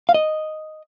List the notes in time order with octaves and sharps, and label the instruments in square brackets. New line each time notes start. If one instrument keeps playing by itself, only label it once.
[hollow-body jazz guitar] F5
D#5